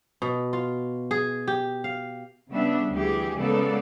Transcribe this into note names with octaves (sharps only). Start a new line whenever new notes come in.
B2
F4
G#4
G4
F5
C#3 G3 B3 D4 E5
D2 E3 G4 G#4
C#3 G#3 A#3 B3 A4 D5